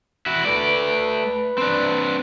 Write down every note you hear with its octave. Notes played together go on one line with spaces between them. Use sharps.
E4 F#4
A3 B4 D5
C4 D4